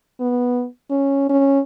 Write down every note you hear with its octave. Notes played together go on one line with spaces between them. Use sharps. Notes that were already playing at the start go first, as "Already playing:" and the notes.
B3
C#4
C#4